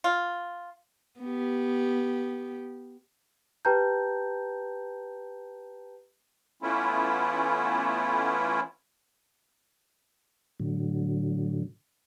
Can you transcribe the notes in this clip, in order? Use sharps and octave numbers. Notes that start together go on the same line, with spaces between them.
F4
B3 G4
G4 B4 G5 A5 A#5 G6
E3 A3 B3 C#4 E4 F4
A2 D3 F#3